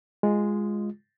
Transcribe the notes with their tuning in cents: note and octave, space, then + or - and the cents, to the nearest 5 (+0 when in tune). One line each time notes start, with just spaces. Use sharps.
G#3 -5 F4 +0